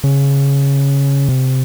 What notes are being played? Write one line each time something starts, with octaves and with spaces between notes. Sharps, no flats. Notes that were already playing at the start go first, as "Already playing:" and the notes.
C#3
C3